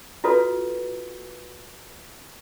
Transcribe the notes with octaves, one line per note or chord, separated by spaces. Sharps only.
F4 F#4 A4 B4